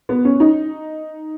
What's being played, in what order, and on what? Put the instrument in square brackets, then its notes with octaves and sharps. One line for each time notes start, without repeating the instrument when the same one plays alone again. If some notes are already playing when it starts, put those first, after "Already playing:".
[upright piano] B3
C#4
D#4